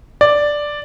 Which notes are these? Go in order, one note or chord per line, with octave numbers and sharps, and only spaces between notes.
D5